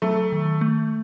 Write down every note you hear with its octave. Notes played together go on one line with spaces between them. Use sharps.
F#3 A3
D#3
A3